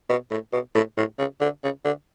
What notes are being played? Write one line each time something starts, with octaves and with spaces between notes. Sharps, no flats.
B2
A2
B2
A2
A2
C#3
D3
C#3
D3